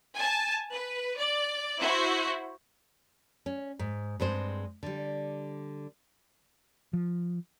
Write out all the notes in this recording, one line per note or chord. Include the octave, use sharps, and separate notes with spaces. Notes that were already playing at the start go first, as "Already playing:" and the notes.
G#5 A5
B4
D5
E4 F#4 C5
C#4
G#2
G2 G#3 C4 C5
D3 G3
F3